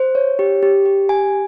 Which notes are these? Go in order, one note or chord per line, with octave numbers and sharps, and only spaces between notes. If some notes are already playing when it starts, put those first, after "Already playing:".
Already playing: C5
C#5
G4
G4
G4
G#5